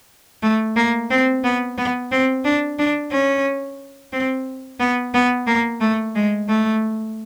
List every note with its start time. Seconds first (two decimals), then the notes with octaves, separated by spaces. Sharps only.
0.43 A3
0.76 A#3
1.10 C4
1.44 B3
1.78 B3
2.11 C4
2.45 D4
2.79 D4
3.11 C#4
4.13 C4
4.80 B3
5.14 B3
5.47 A#3
5.81 A3
6.15 G#3
6.49 A3